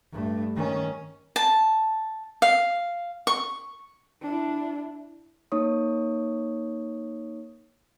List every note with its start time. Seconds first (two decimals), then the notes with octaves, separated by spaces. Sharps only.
0.12 G2 A3
0.56 D#3 C#4
1.36 A5
2.42 F5
3.27 C#6
4.22 D4 E4
5.52 A#3 D#4 C#5 C#6 D#6